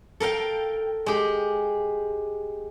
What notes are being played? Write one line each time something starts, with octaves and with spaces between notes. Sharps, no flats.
A4 A#4 F5 G5
G#3 G4